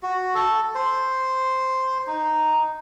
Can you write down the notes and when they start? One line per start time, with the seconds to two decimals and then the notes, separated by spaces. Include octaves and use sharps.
0.03 F#4
0.35 A4
0.75 C5
2.07 D#4